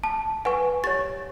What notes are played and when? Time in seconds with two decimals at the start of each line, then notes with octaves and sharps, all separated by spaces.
0.04 A5
0.45 B4 F#5 G#5 C#6
0.84 G4 C#5 A6